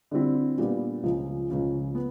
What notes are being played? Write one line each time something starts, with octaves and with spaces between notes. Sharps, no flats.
D3 G3 C4 E4
A#2 G3 B3 D4
C#2 C#3 F3
C#2 C#3 F3
B3